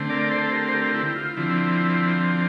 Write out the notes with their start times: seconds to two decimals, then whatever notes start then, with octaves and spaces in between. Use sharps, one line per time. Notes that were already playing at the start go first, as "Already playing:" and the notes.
Already playing: D3 A3 C4
0.10 A#4 D5
0.30 A4 C5
0.44 A4
0.52 G4 A#4
0.69 C5
0.73 G4 A#4
0.94 E4 G4
1.16 F4
1.37 D3 F3 C4 E4